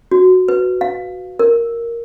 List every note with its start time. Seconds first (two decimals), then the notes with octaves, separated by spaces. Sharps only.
0.12 F#4
0.48 B4
0.81 F5
1.39 A#4